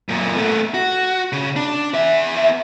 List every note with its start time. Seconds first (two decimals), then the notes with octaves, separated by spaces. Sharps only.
0.09 F#2 A#2
0.35 A3 B3
0.74 F#4
1.32 C#3
1.56 D4
1.94 B3 E5